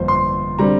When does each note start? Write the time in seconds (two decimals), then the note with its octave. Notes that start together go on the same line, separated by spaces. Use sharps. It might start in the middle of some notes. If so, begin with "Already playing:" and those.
Already playing: G1 F2 F3 A#3 C5
0.08 C6
0.59 D3 G3 C4 A#5